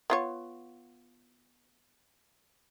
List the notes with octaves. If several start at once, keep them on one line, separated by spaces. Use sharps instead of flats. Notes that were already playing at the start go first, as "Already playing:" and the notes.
B3 F4 C#5